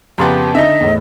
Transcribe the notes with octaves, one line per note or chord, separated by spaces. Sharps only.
F2 C#3 B3 G4 A#5 C6 A6
D3 D#4 D#5 E5
E2 A2